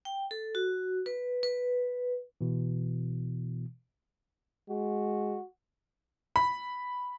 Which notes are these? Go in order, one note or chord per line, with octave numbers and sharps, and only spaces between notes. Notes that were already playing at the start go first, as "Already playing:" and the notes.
G5
A4
F#4
B4
B4
B2 E3
G#3 F#4
B5